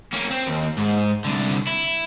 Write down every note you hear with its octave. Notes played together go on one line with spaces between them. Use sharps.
A#3 C#4
C4
D#2
G#2
C2 D3
E4